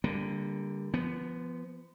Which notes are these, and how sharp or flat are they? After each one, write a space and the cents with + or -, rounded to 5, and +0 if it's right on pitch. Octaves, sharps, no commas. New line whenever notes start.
D3 -10 G3 +25 A#3 +5
F3 -30 B3 +0